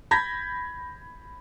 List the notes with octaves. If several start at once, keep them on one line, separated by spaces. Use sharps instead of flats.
B5 G6 G#6 A#6 B6